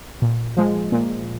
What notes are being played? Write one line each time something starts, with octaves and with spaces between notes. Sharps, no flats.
A#2
F3 G#3
A#2